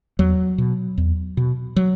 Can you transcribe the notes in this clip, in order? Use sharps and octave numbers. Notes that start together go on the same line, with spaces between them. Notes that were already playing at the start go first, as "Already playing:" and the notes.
E2 F#3
B2
E2
B2
F#3